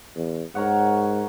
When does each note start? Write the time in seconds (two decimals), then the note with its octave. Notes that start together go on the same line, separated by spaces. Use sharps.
0.16 E2
0.55 G#2 A#4 C#5 F#5